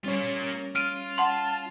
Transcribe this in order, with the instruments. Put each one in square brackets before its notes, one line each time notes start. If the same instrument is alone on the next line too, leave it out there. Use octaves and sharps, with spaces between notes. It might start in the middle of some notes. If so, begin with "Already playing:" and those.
[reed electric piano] G3 C#4 C#5 [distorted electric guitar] A#3 F4
[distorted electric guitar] F4 [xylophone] F6 D7 D#7
[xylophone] F#5 C6 [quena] A5